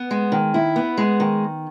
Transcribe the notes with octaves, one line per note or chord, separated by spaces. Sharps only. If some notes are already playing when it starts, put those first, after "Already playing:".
Already playing: B3
G#3
D#3
E4
B3
G#3
D#3